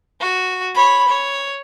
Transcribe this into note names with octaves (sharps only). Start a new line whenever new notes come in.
F#4
C#5 B5
C#5